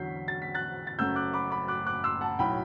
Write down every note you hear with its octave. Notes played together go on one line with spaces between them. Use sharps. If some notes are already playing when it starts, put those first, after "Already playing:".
Already playing: E2 D3 F#3 G6 B6 C7
A6
B6
F#6 A6
A6
F#1 F#2 F#3 A3 E6 G6
D6 F#6
B5 D6
B5 D6
D6 F#6
D6 F#6
C6 E6
F#5 A5
B1 A2 F#3 G5 B5